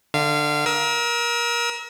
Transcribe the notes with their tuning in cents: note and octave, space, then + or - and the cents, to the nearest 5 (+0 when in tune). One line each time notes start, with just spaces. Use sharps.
D3 +20 F5 -25
A#4 +25 E6 -35